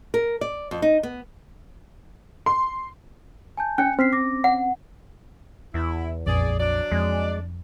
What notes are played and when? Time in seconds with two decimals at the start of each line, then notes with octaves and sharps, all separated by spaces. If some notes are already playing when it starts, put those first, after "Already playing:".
0.14 A#4
0.41 D5
0.71 F2
0.82 D#4
1.03 B3
2.46 C6
3.57 G#5 A5 G6
3.78 C#4 G5 G#5 C#7
3.99 C4 F6 B6 C7
4.12 D6 A#6
4.44 F#5
5.74 E2 E4
6.27 A#1 F2 G#4 D5
6.59 F#3 D4 D5
6.91 F2 G#3